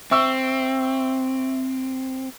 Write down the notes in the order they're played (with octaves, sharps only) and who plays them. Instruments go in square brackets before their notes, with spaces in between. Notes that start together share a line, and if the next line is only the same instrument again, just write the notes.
[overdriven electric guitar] C4 [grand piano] E5 C#6 E6